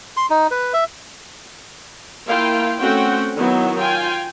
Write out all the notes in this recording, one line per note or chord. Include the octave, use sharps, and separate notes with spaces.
C6
D#4
B4
E5
A#3 E4 F4 F5 G5
A3 C4 C#4 F#4 F#5 G5
D#3 F#3 B3 D#4 E4 F#4
F4 F5 G5 G#5